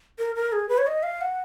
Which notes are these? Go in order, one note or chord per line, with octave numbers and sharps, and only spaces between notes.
A#4
A#4
G#4
B4
C#5
D#5
F5
F#5